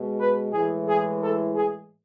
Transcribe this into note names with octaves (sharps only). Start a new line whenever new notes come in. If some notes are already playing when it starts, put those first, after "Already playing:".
Already playing: B2 G#3
B4
A2 E3 G#3 G#4
G#4
A4
G#4